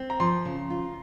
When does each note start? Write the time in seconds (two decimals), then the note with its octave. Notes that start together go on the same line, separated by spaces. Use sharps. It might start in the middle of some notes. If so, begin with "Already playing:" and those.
Already playing: C4
0.10 A#5
0.20 F3 C6
0.45 C#3
0.70 F4